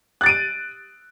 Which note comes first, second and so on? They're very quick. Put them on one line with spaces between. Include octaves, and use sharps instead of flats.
F#6 A6 D7 D#7